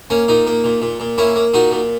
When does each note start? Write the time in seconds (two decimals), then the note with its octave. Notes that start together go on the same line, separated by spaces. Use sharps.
0.10 A#3 C#4
0.28 A#2 D#4
0.47 A#3
0.64 A#2
0.82 A#2
1.00 A#2
1.18 A#3 C#4 E4
1.36 A#3
1.54 A#2 D#4 F#4
1.71 A#2